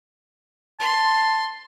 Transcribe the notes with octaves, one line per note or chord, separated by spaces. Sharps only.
A5 C6